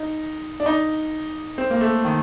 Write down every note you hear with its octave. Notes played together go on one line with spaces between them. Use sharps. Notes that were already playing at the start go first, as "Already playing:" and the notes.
Already playing: D#4
D4
D#4
C4
A#3
A3
D#3